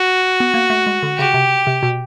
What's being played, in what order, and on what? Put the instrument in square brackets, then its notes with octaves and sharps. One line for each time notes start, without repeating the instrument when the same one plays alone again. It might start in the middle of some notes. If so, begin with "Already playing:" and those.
Already playing: [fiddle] F#4
[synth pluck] B3
A#3
A3
G#3
D3
[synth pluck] C#3 [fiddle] G4
[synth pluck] C3
C3
B2